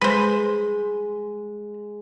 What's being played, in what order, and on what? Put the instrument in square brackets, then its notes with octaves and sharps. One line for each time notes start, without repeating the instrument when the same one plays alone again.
[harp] G#3 [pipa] B4 C5